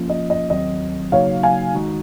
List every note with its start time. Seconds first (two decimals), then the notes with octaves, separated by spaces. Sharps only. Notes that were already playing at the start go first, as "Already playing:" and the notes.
Already playing: F3 A#3 C#4 F4
0.10 D#5
0.30 D#5
0.50 D#2 D#3 F#3 C4 D#5
1.12 C#3 F#3 A#3 D#4 F#4 C#5 F5
1.43 F5 G#5
1.75 D#3 G#3 D#4 F#4